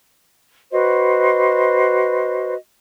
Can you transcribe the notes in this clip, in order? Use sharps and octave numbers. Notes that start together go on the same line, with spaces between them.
F#4 B4 C5 D#5